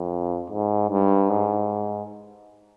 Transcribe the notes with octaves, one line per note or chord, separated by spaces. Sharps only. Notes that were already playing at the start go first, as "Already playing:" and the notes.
Already playing: F2
G#2
G2
G#2